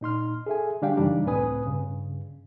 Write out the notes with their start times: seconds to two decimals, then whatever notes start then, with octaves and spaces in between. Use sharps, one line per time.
0.01 A#2 D#4 C6 F6
0.46 G#4 A4 E5 G#5
0.82 D3 G3 D4 G4 F5 G5
0.97 F#2 C#3 E3 G3 D4 D#4
1.26 C#2 A2 C4 B4 G#5 D#6
1.66 G2 C#3